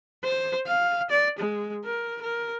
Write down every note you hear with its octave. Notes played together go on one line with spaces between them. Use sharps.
C5
F5
D5
G#3
A#4
A#4